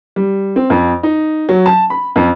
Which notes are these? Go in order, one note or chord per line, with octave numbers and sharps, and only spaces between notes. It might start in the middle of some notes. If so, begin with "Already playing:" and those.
G3
C4
F2
D#4
F#3
A5
B5
F2